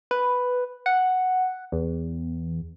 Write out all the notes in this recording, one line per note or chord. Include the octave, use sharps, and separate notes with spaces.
B4
F#5
E2